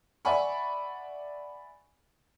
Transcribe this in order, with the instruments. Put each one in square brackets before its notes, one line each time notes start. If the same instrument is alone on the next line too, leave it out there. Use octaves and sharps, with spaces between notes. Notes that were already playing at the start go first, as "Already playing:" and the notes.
[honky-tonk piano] D5 E5 F#5 G#5 B5 C#6